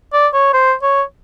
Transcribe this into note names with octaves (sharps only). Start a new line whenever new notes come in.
D5
C#5
C5
C#5